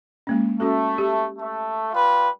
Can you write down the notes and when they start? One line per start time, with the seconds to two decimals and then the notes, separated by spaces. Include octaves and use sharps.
0.27 G#3 A#3 C#4
0.60 A3 C#4 F#4 A4
0.98 G4
1.38 A3
1.92 G3 F4 B4